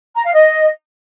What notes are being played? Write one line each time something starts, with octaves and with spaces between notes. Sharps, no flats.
A#5
F5
D#5